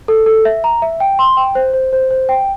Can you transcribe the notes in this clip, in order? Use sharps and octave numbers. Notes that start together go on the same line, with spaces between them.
A4
A4
E5
A#5
E5
G5
C6
G5
C5
C5
C5
C5
G5